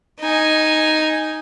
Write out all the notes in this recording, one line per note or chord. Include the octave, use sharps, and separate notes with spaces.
D#4 G#5